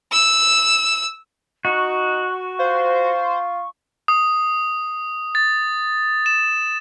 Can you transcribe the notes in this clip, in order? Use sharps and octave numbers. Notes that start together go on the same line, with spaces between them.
E6
D#4 F#4 C#6
F4 C5
D#6
A6
E7